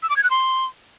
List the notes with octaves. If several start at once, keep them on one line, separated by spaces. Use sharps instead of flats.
E6
D6
G#6
F#6
C6